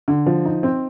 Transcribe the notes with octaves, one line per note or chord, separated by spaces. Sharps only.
D3
F3
D#4
C4